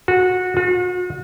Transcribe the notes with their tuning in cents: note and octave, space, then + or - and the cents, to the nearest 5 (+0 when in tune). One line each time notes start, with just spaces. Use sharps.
F#4 -20
F#4 -45